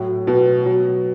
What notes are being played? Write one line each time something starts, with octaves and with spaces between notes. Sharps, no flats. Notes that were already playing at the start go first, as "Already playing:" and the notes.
Already playing: A2 F#3
B2
F#3